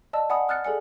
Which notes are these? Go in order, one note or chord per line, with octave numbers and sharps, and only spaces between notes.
D5 D#5 A5 E6
D5 F#5 G#5 B5 D#6
D#6 F6 F#6 A6 C#7
G#4 A4 D5 G#5 C#7